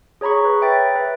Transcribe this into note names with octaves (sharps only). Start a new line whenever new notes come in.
G#4 C#5 A#5 B5 C#6
B4
E5 G5 B5 A6
B4